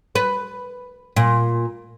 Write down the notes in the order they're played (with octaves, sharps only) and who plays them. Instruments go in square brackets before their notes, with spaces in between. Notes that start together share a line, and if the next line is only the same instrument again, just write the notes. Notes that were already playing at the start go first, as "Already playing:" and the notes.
[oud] B4
A#2